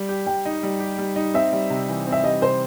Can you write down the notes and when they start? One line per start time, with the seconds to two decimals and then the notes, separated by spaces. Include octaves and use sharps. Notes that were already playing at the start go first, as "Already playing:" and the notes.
Already playing: G3
0.09 G4
0.26 G3 G5
0.45 D#4
0.63 G3
0.80 G4
0.98 G3
1.16 D#4
1.34 C4 E5
1.52 G3
1.70 C3
1.89 E3
2.07 C4
2.12 E5
2.24 G3 D#5
2.42 C3 C5